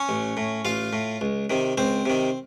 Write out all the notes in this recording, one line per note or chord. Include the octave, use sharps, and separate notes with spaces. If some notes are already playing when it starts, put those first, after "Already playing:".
Already playing: C#4 C#5
A1
A2
A1 F4 F5
A2
C#2
C3 D#3
C#2 C4 C5
C3 D#3